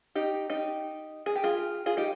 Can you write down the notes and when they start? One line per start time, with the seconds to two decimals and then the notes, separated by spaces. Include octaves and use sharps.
0.15 D#4 G4
0.50 D#4 G4
1.26 G#4
1.36 G4
1.44 F4 G#4
1.86 F4 G#4
1.97 D#4 G4